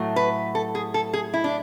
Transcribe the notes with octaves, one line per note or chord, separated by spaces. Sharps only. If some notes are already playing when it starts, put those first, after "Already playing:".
Already playing: A2 F#3 A3
B4
A4
G#4
A4
G#4
E4
D4